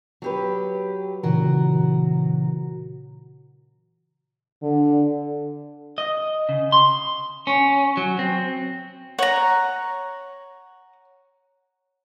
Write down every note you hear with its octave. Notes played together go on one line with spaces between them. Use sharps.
F#3 G4 B4
A#2 C#3 E3 F#3 F#4 A#4
D3
D#5
C#3
C6
C#4
F#3
C4
C#5 F#5 A#5